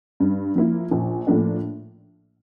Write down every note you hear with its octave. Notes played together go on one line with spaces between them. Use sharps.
G2
F3 A#3 E4
A#1
A2 F3 A#3 D4